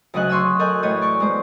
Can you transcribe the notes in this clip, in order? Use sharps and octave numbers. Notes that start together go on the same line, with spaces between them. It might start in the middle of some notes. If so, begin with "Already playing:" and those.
D2 C#3 F#3 D#5 G#5 F#6
C6 C#6 D#6 E6
A4 A#4 D#5 G#5 F#6 G6
A2 E3 A3 C#5 D#5
D5 C#6
G#3 B3 C5